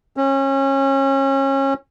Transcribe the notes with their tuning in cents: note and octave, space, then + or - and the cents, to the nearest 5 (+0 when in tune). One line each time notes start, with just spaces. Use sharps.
C#4 -30